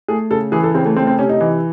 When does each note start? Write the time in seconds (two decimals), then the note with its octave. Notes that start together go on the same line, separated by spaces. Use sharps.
0.08 A3 G#4
0.31 C#3 A4
0.52 E3 G#4
0.63 A4
0.74 C#3 C4
0.85 A3
0.96 A3 C4
1.07 C4
1.19 C3 C#4
1.29 D#4
1.41 E3